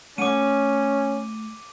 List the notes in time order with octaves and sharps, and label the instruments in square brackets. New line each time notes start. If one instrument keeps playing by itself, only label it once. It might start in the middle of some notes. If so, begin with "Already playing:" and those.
[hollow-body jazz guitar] A3 F#5 [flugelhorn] C#4 [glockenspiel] D6 D#7